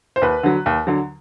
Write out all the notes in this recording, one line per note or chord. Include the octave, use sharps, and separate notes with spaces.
C5
D#2 B4
D3 F#3
D#2
D3 F#3